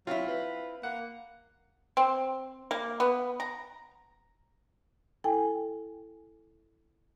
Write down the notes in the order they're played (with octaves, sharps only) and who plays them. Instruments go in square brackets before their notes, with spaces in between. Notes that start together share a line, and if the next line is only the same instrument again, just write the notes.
[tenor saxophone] F#3 [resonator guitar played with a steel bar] C4 E4 [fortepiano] F4
[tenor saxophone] B4
[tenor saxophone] A#3 [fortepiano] F#5
[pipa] C4
A#3
B3
A#5
[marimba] E4 A4 G5 G#5